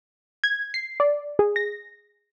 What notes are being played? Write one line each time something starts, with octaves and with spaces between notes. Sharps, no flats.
G#6
C7
D5
G#4
A#6